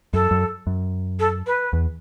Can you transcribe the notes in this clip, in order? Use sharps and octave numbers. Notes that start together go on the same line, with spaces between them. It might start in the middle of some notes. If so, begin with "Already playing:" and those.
F#2 A4
F#2
F#2
A4
B4
E2